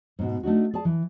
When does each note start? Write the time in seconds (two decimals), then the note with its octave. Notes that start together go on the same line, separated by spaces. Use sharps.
0.19 G#2 B2
0.43 A3 D4 D#4 F#4
0.74 G#4 D5 A5
0.85 E3